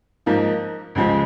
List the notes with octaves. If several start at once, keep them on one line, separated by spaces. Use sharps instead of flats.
G#2 F3 A#3 D#4
C#2 C#3 F3 G#3